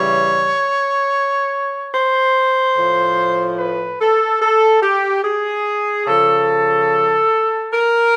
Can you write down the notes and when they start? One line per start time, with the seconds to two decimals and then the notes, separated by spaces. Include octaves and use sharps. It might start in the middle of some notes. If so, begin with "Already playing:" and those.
Already playing: C#3 E3 G3 C#5
1.94 C5
2.77 A2 F3
3.59 B4
4.00 A4
4.42 A4
4.83 G4
5.24 G#4
6.07 C#3 F3 A4
7.73 A#4